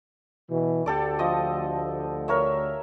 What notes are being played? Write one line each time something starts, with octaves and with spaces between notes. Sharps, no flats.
B2 E3
D2 D3 G4 A4 D5
F3 D#5 D#6
A#4 C#5 E5